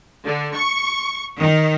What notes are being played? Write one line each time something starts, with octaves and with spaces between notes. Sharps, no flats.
D3
C#6
D#3